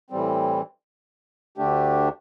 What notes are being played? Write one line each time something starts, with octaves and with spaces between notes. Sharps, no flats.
A2 E3 G3 C4
D2 D3 A3 D4 G4